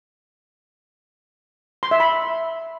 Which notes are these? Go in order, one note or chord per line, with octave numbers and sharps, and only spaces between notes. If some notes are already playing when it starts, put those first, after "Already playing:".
C6
E5
B5